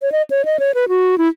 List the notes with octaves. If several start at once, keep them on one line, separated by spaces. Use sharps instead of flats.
C#5
D#5
C#5
D#5
C#5
B4
F#4
E4